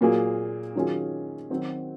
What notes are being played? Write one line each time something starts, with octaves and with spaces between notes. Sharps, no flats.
A#2 F#3 A#3 F4 G#4
D#3 F#3 C#4 F4 G#4
D#3 F#3 C4 F#4